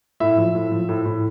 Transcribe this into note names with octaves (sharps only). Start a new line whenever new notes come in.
A2 E5
F3
A2
F3
A2
A2